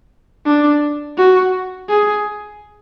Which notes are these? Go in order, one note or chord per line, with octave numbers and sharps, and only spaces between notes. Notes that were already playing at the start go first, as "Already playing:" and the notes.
D4
F#4
G#4